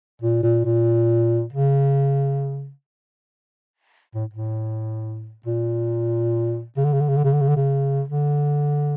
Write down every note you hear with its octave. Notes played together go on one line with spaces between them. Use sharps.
A#2
A#2
A#2
C#3
A2
A2
A#2
C#3
D3
C#3
D3
C#3
D3
C#3
D3
C#3
D3
C#3
D3